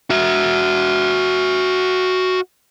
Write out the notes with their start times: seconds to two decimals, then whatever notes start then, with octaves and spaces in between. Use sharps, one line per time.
0.10 F#4 E5